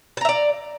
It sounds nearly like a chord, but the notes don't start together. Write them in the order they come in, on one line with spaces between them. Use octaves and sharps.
A5 A#5 E5 D5